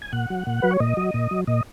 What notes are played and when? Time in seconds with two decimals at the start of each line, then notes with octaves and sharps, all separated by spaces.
0.02 G#5
0.13 A#2 F#5
0.30 F#3
0.47 A#2
0.62 F#3 B4
0.71 C#5
0.80 A#2 D#5
0.97 F#3
1.14 A#2
1.31 F#3
1.47 A#2 D#5